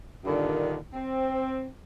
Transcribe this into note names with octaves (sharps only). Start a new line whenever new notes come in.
G2 A#2 D3 D#3
C4